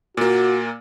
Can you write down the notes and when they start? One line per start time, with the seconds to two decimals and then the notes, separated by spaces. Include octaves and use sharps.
0.17 A#2 A#3 F#4